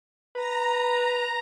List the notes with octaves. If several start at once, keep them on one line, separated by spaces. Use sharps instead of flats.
B4 A#5